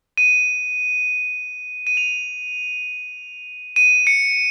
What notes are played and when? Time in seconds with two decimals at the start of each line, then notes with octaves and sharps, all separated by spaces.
0.18 D#7
1.87 D#7
1.97 F7
3.76 D#7
4.07 C#7